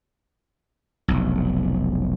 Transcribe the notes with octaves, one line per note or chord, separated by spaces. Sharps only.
F1 B1